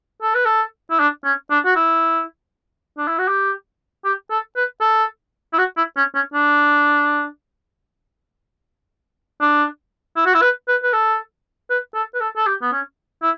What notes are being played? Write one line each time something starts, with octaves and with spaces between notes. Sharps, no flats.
A4
B4
A4
E4
D4
C#4
D4
F#4
E4
D4
E4
F#4
G4
G4
A4
B4
A4
E4
F#4
E4
C#4
C#4
D4
D4
E4
F#4
E4
B4
B4
B4
A4
B4
A4
B4
A4
A4
G4
B3
C#4
E4